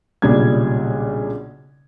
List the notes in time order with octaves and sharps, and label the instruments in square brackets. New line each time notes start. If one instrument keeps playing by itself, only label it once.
[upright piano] B1 A#2 C#3 G3 D4 G#6